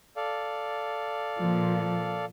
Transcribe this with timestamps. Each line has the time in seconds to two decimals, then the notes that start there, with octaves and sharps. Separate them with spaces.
0.16 A4 D5 F5
1.38 A#2 F3